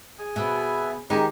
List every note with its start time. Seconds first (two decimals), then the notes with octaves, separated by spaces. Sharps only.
0.19 G#4
0.36 B2 B3 E5
1.10 D#3 G#3 D#4 G4